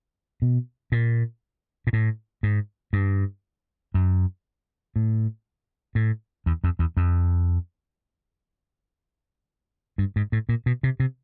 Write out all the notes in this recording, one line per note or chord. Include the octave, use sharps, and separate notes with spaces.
B2
A#2
A#2
A2
G#2
G2
F#2
A2
A2
E2
F2
E2
F2
G2
G#2
A2
A#2
B2
C3
C3